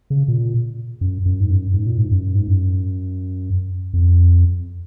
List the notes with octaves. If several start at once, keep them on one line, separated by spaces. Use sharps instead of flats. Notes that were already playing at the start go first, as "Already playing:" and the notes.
C#3
A#2
F#2
F#2
G#2
F#2
G#2
A#2
G#2
F#2
G#2
F#2
F2